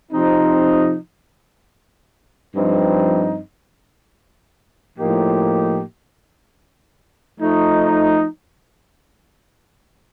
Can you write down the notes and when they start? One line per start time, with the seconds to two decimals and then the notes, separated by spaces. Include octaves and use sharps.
0.12 C3 F3 C4 D#4
2.55 G2 F3 C4 D#4
4.97 A2 F3 A#3 D#4 G4
7.40 F3 A3 D#4